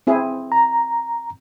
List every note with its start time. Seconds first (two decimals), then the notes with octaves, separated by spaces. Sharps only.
0.07 C4 E4 G#4
0.52 A#5